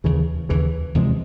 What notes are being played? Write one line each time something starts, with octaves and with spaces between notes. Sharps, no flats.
D#2 C#3 E3
D#2 C#3 E3
E2 C3 F3 G#3